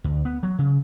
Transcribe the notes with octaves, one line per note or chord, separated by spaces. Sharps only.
D2
B3
F#3
C#3